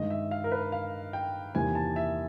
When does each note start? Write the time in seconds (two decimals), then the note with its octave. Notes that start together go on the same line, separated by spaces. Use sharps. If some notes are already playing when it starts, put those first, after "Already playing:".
Already playing: G2 D#3 G#3 D#5
0.10 E5
0.31 F5
0.44 A#4
0.52 B4
0.72 F5
1.13 G5
1.55 E2 C3 D#3 G3 A#3 G#5
1.75 A5
1.96 E5